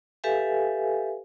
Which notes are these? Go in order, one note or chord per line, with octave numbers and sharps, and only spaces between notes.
G4 A4 B4 E5 F5 G#5